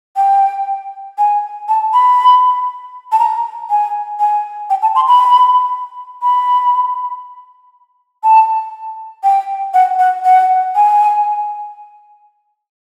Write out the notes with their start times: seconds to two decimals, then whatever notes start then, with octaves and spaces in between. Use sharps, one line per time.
0.17 G5
1.18 G#5
1.69 A5
1.93 B5
3.12 A5
3.19 A#5
3.70 G#5
4.20 G#5
4.70 G5
4.82 A5
4.96 C6
5.08 B5
6.22 B5
8.24 A5
9.24 G5
9.74 F#5
9.99 F#5
10.25 F#5
10.76 G#5